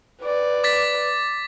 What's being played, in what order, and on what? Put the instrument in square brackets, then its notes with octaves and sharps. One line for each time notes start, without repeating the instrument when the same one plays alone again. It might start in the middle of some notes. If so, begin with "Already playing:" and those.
[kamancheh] B4 D5
[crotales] D6 A6 B6